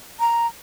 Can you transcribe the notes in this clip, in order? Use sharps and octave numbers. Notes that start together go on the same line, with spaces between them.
A#5